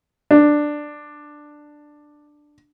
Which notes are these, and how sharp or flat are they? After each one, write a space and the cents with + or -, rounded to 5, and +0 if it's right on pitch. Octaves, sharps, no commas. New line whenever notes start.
D4 +10